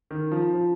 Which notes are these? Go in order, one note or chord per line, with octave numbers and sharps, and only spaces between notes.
D#3
F3
F3